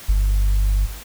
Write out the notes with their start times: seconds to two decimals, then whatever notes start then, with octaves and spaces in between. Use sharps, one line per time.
0.08 G1